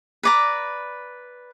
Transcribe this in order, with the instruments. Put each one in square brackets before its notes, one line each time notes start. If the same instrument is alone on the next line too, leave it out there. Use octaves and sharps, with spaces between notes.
[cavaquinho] B4 D5 A#5